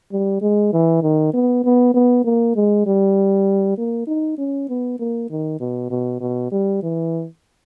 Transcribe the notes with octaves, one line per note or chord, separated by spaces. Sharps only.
G3
G#3
E3
D#3
B3
B3
B3
A#3
G#3
G3
A#3
D#4
C#4
B3
A#3
D#3
B2
B2
B2
G3
E3